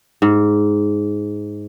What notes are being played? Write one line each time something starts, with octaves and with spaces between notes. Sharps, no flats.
G#2